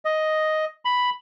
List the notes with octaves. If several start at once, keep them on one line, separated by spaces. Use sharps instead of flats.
D#5
B5